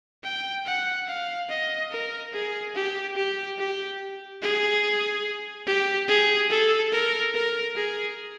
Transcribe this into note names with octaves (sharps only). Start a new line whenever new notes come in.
G5
F#5
F5
D#5
A#4
G#4
G4
G4
G4
G#4
G4
G#4
A4
A#4
A#4
G#4